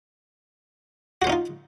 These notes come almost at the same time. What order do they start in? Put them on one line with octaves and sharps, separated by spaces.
F#4 C5 C#4 D#4 F4